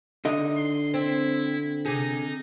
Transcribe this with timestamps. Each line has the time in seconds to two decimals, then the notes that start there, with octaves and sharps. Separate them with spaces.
0.25 D3 D#4 D#5
0.57 C6
0.94 C4 E4
1.85 C3 D#4 G#4